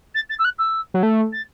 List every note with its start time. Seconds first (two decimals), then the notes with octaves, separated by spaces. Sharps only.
0.15 A6
0.30 A6
0.39 E6
0.45 F#6
0.59 E6
0.94 F#3
1.03 A3
1.33 A6